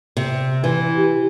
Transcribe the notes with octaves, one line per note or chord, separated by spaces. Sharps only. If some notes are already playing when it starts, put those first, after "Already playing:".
C3
E3
G4